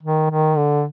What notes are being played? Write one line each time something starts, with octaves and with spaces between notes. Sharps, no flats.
D#3
D#3
D3